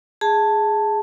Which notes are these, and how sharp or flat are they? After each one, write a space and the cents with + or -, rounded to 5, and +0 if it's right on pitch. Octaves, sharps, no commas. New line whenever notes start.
G#4 +0 A5 +0